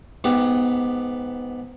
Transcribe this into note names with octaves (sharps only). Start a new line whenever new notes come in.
G#2 B3 G4